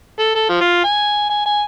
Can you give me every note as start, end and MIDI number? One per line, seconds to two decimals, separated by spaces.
0.19 0.35 69
0.35 0.45 69
0.49 0.58 53
0.60 0.84 65
0.84 1.25 80
1.30 1.41 80
1.46 1.62 80